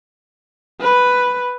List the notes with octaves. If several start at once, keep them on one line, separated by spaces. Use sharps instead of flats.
B4